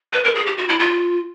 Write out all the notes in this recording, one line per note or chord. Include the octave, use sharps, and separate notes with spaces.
B4
A#4
G#4
G4
F#4
E4
F4